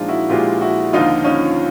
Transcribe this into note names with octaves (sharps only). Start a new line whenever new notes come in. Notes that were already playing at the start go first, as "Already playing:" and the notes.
Already playing: A#2 F3 G#3 D4 D#4 F4
E4 F#4
A#2 F3 G#3 F4 G4
E4 F#4
D#2 D3 F3 D#4 F4
C#4 D#4